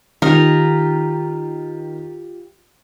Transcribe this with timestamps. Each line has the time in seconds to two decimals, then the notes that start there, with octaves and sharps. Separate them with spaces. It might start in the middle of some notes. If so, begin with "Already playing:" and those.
0.22 D#3 D#4 F4 G4 A#4 F5